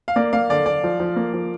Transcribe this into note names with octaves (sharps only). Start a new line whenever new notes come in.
F5
A#3 D5
A#3 F5
D3 D5
D3 D5
F3
F3
A#3
F3